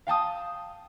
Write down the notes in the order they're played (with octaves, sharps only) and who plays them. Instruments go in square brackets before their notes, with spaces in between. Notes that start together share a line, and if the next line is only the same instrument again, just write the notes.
[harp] F5 G5 A5 D#6